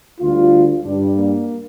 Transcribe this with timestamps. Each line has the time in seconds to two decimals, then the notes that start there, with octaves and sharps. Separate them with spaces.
0.21 D2 D3 G3 F4
0.83 G2 G3 D4
1.14 A#3